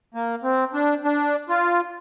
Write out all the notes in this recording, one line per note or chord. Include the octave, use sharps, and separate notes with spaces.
A#3
C4
D4
D4
F4